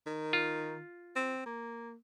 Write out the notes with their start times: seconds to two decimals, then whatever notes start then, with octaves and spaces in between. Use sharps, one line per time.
0.07 D#3
0.33 F4
1.16 C4
1.46 A#3